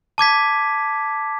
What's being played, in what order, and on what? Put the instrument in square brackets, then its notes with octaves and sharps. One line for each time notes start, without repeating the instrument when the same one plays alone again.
[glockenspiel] A5 D6 G#6 B6